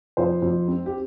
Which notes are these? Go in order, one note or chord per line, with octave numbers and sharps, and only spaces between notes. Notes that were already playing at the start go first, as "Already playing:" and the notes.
F2 C5
F2
C4
G4